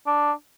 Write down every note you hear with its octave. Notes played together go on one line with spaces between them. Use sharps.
D4